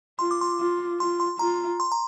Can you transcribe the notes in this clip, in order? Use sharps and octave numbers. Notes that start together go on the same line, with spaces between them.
F4 C6
D6
C6
F4
F4 C6
C6
F4 A#5
C6
A#5